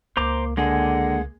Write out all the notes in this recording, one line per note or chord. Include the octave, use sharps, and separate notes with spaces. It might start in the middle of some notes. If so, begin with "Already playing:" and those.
C#2 A#3 C5 A#5 D6
D3 G#3 A#3 G#4 F#5